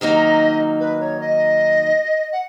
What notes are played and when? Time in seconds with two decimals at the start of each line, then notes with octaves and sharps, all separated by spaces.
0.01 D#3 F#3 A#3 D#4 D#5
0.80 B4
1.00 C#5
1.20 D#5
2.32 F#5